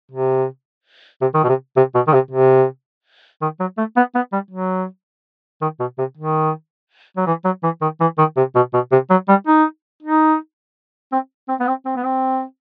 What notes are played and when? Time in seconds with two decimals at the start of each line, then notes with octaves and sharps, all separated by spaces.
0.11 C3
1.21 C3
1.34 D#3
1.44 B2
1.49 C3
1.77 C3
1.95 B2
2.07 D#3
2.13 C3
2.31 C3
3.42 D#3
3.60 F#3
3.78 A3
3.96 B3
4.15 B3
4.32 G3
4.51 F#3
5.61 D#3
5.80 B2
5.98 C3
6.17 D#3
7.17 F#3
7.27 E3
7.44 F#3
7.63 E3
7.81 D#3
8.00 E3
8.18 D#3
8.37 C3
8.55 B2
8.74 B2
8.92 C3
9.10 F#3
9.28 G3
9.47 D#4
10.02 D#4
11.12 C4
11.49 C4
11.60 B3
11.67 C4
11.85 C4
11.96 B3
12.03 C4